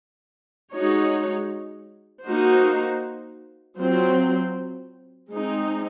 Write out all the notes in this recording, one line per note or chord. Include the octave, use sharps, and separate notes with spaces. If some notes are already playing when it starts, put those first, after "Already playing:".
G#3 D#4 F#4 C#5
A#3 D#4 F#4 C5
F#3 C4 F4 C5
G#3 C4 D#4